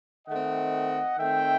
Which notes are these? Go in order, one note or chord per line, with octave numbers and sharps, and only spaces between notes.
D#3 A3 C4 D#5 F#5
D#3 A3 C4 E5 G5